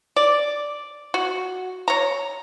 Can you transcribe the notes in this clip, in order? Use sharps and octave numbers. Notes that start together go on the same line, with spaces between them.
D5
F#4
C#5 A#5